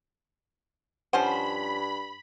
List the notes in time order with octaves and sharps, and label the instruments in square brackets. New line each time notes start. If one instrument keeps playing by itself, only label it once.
[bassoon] G2 [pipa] F3 C#4 C5 [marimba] F#5 [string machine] B5